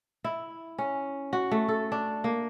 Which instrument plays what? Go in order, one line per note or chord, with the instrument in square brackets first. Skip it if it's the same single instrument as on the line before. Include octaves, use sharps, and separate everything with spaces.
[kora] E4
C#4
F#4
A3
A4
D4
A#3